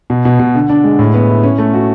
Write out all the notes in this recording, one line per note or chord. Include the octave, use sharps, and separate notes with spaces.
B2
B2
B2
D3
D4
G#3
A2
B3
E4
C#4
A3
F#4